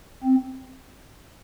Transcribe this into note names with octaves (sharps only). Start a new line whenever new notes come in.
C4